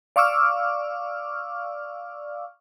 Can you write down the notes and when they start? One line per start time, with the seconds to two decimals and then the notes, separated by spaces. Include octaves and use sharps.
0.16 D5 F5 C#6 D6 E6 F6